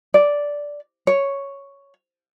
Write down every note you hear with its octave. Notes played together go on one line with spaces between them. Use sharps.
D5
C#5